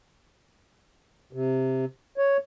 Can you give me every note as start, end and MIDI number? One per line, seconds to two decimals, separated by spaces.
1.33 1.85 48
2.18 2.37 73